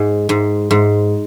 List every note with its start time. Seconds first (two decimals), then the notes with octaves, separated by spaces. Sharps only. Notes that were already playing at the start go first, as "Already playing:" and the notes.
Already playing: G#2
0.29 G#2
0.71 G#2